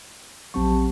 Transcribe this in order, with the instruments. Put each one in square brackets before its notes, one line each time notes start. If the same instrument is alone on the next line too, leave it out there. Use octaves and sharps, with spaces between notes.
[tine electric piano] A#1 C4 C#6 [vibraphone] F#3 G4 A5